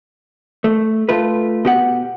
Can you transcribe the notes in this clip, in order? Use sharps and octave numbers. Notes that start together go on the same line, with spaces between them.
A3
A3 F4 B4
B2 G4 F#5